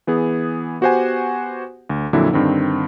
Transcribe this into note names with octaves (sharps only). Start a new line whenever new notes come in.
E3 B3 G#4
B3 F#4 G4 C5 F#5 G#5
D2
F2 A#2 D3 F#3 E4
G2 D3 D#3 C4 D#4